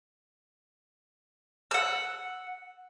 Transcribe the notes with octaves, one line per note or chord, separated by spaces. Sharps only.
F#5 E6